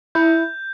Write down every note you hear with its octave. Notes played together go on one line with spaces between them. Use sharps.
E4 G6